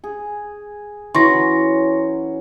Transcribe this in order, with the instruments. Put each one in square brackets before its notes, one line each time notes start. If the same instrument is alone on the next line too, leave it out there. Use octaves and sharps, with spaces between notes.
[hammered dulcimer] G#4
[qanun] E3 [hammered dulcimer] F#3 C#4 F#5 [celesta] C6 C#6 A#6